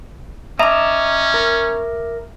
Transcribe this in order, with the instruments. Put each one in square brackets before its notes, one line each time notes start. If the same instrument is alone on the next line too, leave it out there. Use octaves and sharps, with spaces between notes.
[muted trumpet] C#4 [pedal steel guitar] D#5 A5 A#5 [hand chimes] E5 D6
[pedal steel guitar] A#4